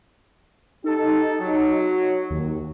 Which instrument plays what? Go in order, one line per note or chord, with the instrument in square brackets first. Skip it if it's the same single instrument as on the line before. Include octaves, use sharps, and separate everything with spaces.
[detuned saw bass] D#4 [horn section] G4 A4
[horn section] F#3
[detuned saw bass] D#2